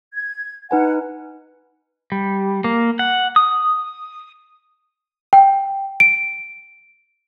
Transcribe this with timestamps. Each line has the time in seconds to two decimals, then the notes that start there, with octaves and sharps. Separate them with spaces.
0.13 G#6
0.71 D#4 B4 F#5 G#5
2.12 G3
2.64 A#3
2.99 F#5
3.36 D#6
5.33 G5
6.00 D7